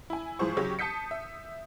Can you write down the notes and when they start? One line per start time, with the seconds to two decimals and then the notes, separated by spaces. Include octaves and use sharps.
0.10 E4 G#5
0.39 G#2 E3 F3 C5 C#6
0.57 C#3 F#3 G4 C#6
0.79 A5 D#6 G6 B6 C#7
1.11 E5